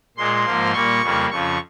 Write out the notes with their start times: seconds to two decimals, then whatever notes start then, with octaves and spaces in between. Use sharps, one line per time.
0.17 A#2 G#3 C6
0.45 G#2 F3 A#3
0.73 A#2 G3 A#3 C#6
1.02 F2 C#3 G3 A#3
1.30 F2 C#3 F3 C#6